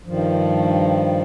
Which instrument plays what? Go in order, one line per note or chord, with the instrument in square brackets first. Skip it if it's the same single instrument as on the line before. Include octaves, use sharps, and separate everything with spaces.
[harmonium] G2 D#3 F3